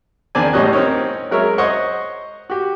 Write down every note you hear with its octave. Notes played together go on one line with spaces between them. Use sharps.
E2 D#3 C4 D4 D5 G#5
E2 A2 G3 C#4 D#5 F#6
C4 C#4 D#4 A#4 C#5
F#3 G#3 A#4 C#5 E5
C5 C#5 D#5 F#5 C#6
F#4 G4